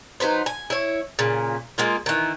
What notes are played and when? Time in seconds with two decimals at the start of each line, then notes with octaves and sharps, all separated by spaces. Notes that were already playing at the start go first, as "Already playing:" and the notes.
0.20 F#3 D#4 B4 C5
0.46 G#5
0.70 E4 C#5
1.19 A#2 C#3
1.78 G#3 A#3 F4
2.06 D#3 E3